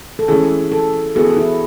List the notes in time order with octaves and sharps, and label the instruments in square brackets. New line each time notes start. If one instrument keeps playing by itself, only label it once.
[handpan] A4
[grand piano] E3 A3 C#4 [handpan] G#4
[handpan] A4
[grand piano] E3 B3 F#4 A4 [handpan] G#4
[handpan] E4